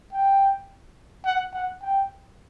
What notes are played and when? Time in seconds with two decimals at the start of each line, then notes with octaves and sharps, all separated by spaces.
0.13 G5
1.25 F#5
1.53 F#5
1.82 G5